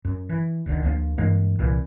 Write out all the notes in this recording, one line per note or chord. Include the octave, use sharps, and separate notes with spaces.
F#2
E3
F1 D2 D3 D#3
D2 F3 A#3
G2 E3 G#3 A#3
C2 A#2 E3